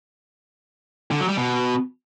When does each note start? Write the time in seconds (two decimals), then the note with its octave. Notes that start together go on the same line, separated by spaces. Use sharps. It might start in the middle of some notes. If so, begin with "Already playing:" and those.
1.11 D3
1.20 F#3
1.29 G3
1.37 B2